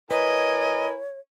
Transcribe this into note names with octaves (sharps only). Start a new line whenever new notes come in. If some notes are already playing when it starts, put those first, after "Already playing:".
E4 A#4 B4 C#5 D#5 G#5